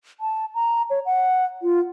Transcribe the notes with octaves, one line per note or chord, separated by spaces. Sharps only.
A5
A#5
C#5
F#5
F4